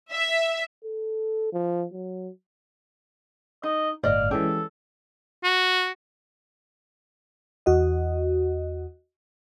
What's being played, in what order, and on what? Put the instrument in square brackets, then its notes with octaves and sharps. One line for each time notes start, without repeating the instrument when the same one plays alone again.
[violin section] E5
[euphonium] A4
F3
F#3
[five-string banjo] D#4 [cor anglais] D#5
[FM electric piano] G1 A2 [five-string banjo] D5 D#5 [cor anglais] F5
[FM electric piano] E3 G#3 C#4 [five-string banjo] G4 [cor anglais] A4
[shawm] F#4
[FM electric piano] E2 F#4 D#5